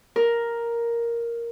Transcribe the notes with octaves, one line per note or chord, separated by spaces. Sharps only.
A#4